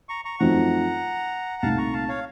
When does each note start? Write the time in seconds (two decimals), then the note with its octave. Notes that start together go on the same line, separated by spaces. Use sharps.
0.09 A#5 C#6
0.25 A#5 C#6
0.39 F#2 F3 A3 C4 D#4 F#5 A#5
1.62 C2 A#2 A3 D#4 F5 A5
1.78 A#5 C#6
1.93 F5 A5
2.09 C#5 F5